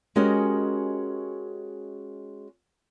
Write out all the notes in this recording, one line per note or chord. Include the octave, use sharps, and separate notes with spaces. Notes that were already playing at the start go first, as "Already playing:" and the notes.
G#3 C#4 F#4 G4 A#4 D#5